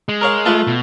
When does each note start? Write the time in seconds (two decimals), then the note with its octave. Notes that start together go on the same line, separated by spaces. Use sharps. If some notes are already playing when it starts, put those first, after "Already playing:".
0.09 G#3
0.21 A#4 C#5 F5
0.46 A3 F4 B4
0.67 B2